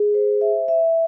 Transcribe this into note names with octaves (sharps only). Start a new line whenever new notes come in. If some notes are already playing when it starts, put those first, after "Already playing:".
Already playing: G#4
C5
E5
E5